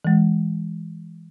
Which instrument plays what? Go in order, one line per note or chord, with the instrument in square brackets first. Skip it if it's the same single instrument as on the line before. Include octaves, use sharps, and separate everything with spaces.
[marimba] E3 G#3